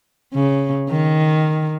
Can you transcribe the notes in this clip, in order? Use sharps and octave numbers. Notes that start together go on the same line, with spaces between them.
C#3
D#3